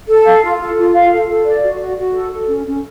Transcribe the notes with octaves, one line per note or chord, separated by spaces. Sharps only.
A4
F5
F4
A4
F4
F5
A4
A4
D5
F#4
F#4
F#4
A4
A4
C#4
C#4